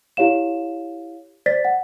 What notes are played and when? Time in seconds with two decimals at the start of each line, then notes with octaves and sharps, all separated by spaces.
0.17 E4 G4 C#5 F5 E7
1.46 C5 D5 A6 B6
1.65 F#5